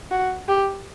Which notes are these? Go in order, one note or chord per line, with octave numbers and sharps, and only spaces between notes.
F#4
G4